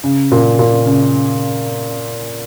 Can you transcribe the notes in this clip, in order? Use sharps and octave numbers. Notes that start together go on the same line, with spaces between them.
C#3
A#2
A#2
C#3